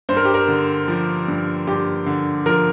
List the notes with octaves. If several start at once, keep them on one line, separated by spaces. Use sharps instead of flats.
G2 C5
A#4
G4
A#4
D3
F3
G2
G2 G4
D3
F3 A#4